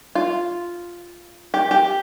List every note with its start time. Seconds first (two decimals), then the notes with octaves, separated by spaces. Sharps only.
0.15 F4
1.54 G4
1.71 G4